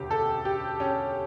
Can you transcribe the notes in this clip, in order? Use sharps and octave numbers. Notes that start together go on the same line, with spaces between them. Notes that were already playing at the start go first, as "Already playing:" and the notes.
Already playing: E1 D2 C#3 G4
A4
G4
C#4